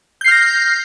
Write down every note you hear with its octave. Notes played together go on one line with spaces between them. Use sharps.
F6 G6 A#6 C7